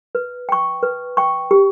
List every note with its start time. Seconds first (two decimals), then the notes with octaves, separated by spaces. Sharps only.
0.15 B4
0.49 G5 C#6
0.83 B4
1.17 G5 C#6
1.51 G4